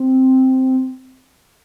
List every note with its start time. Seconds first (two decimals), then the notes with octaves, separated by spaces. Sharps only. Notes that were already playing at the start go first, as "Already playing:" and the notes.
Already playing: C4